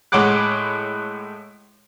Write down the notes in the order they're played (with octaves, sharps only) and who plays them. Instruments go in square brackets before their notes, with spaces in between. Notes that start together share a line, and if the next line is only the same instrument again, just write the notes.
[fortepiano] A2 G#3 C#5 F#5 D6 F#6